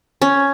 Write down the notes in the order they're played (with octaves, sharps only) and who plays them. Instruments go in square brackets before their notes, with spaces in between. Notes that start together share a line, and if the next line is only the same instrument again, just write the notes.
[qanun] C#4